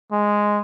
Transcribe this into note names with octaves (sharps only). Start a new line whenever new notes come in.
G#3